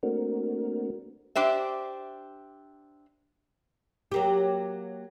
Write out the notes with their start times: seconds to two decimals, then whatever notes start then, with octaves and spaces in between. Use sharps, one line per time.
0.03 A3 A#3 C4 D4 F#4 A#4
1.35 D4 G4 C5 E5
4.12 F#3 A#3 G4